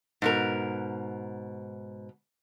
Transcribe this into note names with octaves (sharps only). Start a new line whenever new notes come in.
G#2 B2 A#4